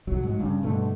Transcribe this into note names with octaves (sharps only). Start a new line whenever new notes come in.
B1 E2 F#3
G#2 F#3
G2 C#3
G2 B2 D3 A3